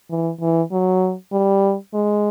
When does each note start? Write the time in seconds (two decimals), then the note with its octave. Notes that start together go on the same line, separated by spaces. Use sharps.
0.10 E3
0.41 E3
0.72 F#3
1.32 G3
1.94 G#3